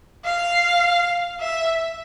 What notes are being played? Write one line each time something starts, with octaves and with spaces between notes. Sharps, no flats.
F5
E5